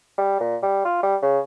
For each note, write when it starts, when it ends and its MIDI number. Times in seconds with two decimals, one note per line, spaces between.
0.18 0.38 55
0.40 0.57 46
0.63 0.80 55
0.85 1.00 65
1.03 1.16 55
1.22 1.39 49